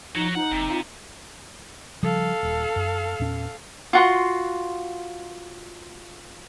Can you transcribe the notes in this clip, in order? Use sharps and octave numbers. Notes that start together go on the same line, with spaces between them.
F3 D#4 F#4 C#5
D#4 F#5
F#1 C3
F4
C#3 F3 G3 A4 F5
D#1
F#2
E2 A#2 C#4
F4 F#4 C6